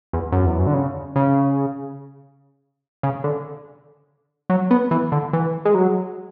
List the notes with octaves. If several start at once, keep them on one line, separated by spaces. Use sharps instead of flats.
E2
F#2
E2
F#2
D3
C#3
C#3
C#3
D3
F#3
B3
E3
D3
E3
G#3
F#3